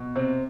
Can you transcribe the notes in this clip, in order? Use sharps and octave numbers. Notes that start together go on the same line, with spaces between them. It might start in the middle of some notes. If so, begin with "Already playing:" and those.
Already playing: B2
C3 C4